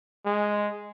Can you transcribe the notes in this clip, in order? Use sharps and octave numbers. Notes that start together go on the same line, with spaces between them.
G#3